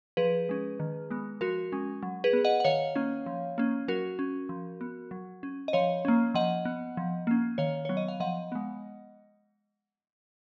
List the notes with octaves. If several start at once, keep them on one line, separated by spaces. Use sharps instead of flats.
F3 G#4 B4
G#3 C#4
D#3
G#3 B3
F3 F#4 A#4
G#3 C#4
F#3
G#4 B4
B3
D#5 F#5
F#5
D#3 C#5 F5
A#3 C#4
F3
A#3 C#4
F#3 F#4 A#4
C#4
F3
B3
F#3
C#4
D#5
F3 C#5 F5
A#3 C#4
F3 D#5 F#5
B3
F3
A#3 C#4
D#3 C#5 F5
F#3 B3 C#5
D#5
F5
F3 D#5 F#5
G#3 B3